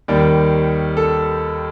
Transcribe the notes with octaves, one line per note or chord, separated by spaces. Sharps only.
D#2 D#3 G3
A4